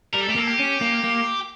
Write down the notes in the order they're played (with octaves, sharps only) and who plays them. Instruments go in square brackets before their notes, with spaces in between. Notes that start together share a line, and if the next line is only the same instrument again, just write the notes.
[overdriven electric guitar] G3 [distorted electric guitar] A#4
[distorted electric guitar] A4
[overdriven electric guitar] A3 [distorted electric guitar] G4
[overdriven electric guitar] A#3 [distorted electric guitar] A4
[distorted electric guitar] G4
[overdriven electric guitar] C#4
A#3
A#3